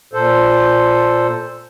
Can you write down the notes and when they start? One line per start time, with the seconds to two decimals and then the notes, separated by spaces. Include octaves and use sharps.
0.13 A#2 A4 C5